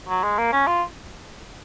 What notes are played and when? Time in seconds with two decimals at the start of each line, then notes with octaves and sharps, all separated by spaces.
0.08 F#3
0.23 G#3
0.38 A#3
0.53 C#4
0.67 F4